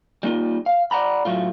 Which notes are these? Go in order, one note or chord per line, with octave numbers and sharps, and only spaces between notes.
G3 A#3 D#4 F4
F5
D5 F#5 A#5 B5
A2 F#3 A3 F4